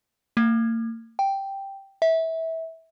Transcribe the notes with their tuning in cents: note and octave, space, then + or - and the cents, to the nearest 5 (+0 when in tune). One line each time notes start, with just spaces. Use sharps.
A#3 -40
G5 +0
E5 -20